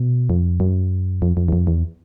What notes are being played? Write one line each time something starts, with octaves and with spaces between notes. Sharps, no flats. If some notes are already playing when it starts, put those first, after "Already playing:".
Already playing: B2
F2
F#2
F2
F2
E2
F2
E2